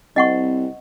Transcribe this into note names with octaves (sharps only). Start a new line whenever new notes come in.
C2 C4 D#5 F#5 C#6